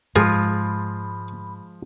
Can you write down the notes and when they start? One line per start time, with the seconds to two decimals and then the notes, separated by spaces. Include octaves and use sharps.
0.16 G#2 F3 G#3 F4 G#4 B5